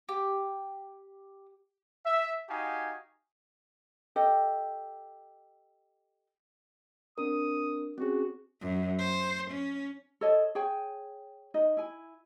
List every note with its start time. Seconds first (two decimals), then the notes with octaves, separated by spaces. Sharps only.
0.09 G4
2.04 E5
2.49 D#4 F#4 G4 F5 G#5
4.16 G4 A4 D#5
7.18 C4 D4 A#4 D#6
7.98 C4 C#4 F#4 G#4
8.61 F#2
8.99 C5
9.51 C#4
10.21 A4 C#5 D#5 A5
10.55 G#4 C#5 G5 G#5
11.54 D#4 D#5
11.77 E4 G#5